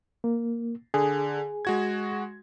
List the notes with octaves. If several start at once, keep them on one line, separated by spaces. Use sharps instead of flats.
A#3
D3 G#4
G#3 F#4 G#6